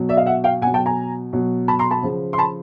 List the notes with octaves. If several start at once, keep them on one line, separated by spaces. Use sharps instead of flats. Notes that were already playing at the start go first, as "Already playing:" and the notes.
Already playing: B2 F#3
D5 E5
D#5 F5
E5 F#5
F5 G5
B2 F#3 F#5 G#5
G5 A5
G#5 A#5
B2 F#3
A5 B5
A#5 C6
A5 B5
C#3 F3
C6
A5 B5